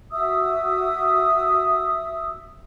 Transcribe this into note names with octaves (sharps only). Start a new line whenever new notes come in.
F#4 E5 D#6 E6